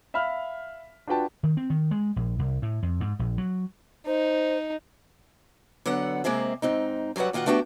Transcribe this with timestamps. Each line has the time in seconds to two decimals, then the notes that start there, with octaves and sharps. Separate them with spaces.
0.14 E5 F5 B5 F6
1.07 D4 F4 F#4 B4 G5 A5
1.43 D#3
1.57 C4
1.70 D#3
1.91 G#3
2.16 A#1
2.39 C2
2.62 A2
2.82 F2
3.01 G#2
3.19 A#1
3.38 F#3
4.06 D#4 C5
5.86 D3 F#3 B3 F#5
6.24 C3 G#3 A#3 C4 G#4 E5
6.62 G#2 C4 D#4
7.16 F#2 F#3 G3 B4 F#5
7.33 A#2 D#3 F4 F#4 F#5
7.46 A3 B3 D4 F#4 G4 G5